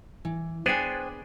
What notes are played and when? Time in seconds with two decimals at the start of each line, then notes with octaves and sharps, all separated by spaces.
0.25 E3
0.66 B3 D4 G#4 C5 G5 G#5